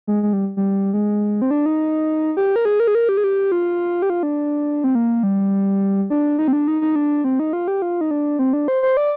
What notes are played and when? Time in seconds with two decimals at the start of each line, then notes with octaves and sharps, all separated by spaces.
0.07 G#3
0.23 G#3
0.33 G3
0.57 G3
0.93 G#3
1.42 C4
1.51 D4
1.66 D#4
2.37 G4
2.56 A#4
2.65 G#4
2.80 A#4
2.87 G#4
2.95 A#4
3.09 G4
3.17 G#4
3.24 G4
3.52 F4
4.02 G4
4.10 F4
4.23 D4
4.84 C4
4.95 A#3
5.23 G3
6.10 D4
6.39 D#4
6.48 C4
6.53 D4
6.68 D#4
6.81 D#4
6.96 D4
7.24 C4
7.39 D#4
7.53 F4
7.68 G4
7.82 F4
8.01 D#4
8.11 D4
8.39 C4
8.53 D4
8.68 C5
8.82 C5
8.97 D5